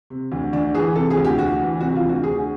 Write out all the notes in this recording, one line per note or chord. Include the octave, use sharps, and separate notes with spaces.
C3
D2
D2 D4
E3 G#4
C3 A4
G#4
D2
G4
D2 F#4
E3
C3 F#4
F4
D2
F#4
D2 G#4